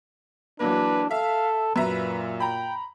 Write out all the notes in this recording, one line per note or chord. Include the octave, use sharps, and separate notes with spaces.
E3 F#3 A#3 D4 B4
A4 E5 F5
F#2 A#2 B4 E5 A#5
G5 A#5 B5